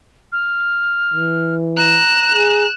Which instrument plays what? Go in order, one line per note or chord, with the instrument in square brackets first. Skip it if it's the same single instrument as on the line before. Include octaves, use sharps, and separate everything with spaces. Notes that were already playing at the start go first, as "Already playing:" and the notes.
[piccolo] F6
[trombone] E3
[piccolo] A#5 [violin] F#6 E7
[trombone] G#4